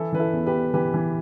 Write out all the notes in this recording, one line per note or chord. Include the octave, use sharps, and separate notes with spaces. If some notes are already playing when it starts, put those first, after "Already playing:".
Already playing: E3 E4 A4
E3 B4
E4 A4
E2
G4 B4
E2
E3 G4 B4
E3